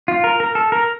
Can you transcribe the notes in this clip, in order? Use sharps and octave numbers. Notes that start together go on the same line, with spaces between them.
F4
A#4
A#4
A4
A#4